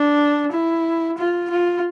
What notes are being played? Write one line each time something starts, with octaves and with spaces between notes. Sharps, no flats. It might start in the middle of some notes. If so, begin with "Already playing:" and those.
Already playing: D4
E4
F4
F4